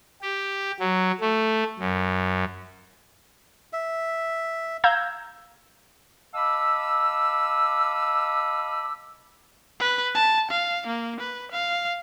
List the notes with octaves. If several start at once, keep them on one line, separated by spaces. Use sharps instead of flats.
G4
F#3
A3
F#2
E5
F5 A#5 E6 G6 G#6
D#5 F5 A5 B5 D6 E6
B4
A5
F5
A#3
B4
F5